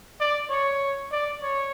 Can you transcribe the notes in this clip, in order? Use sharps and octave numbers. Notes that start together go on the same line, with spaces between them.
D5
C#5
D5
C#5